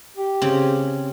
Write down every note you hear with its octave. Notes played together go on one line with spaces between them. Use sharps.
G4
C#3 C4